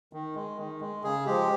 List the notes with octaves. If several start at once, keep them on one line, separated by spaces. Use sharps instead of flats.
D#3
G#3
D#3
G#3
C#3 G#4
F3 G#3 G4